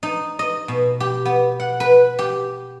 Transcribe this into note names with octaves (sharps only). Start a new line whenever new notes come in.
D#4
D#5
B2
G4
B3
F#5
B4
G4